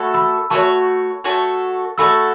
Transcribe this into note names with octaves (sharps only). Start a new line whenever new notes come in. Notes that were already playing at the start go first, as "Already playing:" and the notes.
Already playing: A3 F#4 A4 C#5 B5 E6
B5 E6
A3 F#4 A4 C#5 A5 C#6
A3 F#4 A4 C#5
A3 F#4 A4 C#5 B5 E6